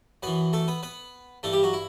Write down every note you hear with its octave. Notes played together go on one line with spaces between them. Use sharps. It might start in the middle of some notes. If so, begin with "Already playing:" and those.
F#2 E3 B3 B4
A3 A4
B3 B4
B3 B4
G2 E3 A3 A4
G3 G4
F#3 F#4
E4